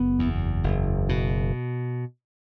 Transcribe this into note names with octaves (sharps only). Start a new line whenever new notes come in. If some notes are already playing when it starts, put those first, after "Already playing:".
Already playing: F#1 B3
E2
F#1
B2